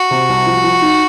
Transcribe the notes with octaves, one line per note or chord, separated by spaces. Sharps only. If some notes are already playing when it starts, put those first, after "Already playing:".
Already playing: F#4
C3
C2
F3
F3
D#4